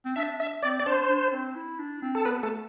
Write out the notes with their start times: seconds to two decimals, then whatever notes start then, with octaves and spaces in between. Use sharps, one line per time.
0.05 C4
0.16 D4 E5
0.40 E5
0.63 C4 D5
0.80 C4 D5
0.86 D4 C5
1.09 D4
1.32 C4
1.56 E4
1.79 D4
2.02 C4
2.15 A4
2.25 B3 B4
2.43 A3 A4